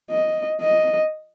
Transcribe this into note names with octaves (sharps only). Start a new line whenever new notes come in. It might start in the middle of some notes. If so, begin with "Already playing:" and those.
D#5
D#5